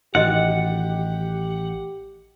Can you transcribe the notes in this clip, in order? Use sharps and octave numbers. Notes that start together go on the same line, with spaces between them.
A1 D#3 F#4 G4 D#5 F#5